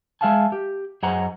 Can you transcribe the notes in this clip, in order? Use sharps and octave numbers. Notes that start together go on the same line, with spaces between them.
G#3 G#4 E5 F5 G#5 A5
G4
F#2 G#4 C5 D#5 F#5 A#5